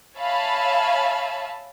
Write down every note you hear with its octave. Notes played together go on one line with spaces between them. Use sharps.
C#5 E5 F5 G#5 A5 B5